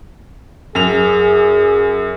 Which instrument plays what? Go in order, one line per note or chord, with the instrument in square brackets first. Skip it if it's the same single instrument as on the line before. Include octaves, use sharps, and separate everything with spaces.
[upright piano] F#2 F7 [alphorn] G#4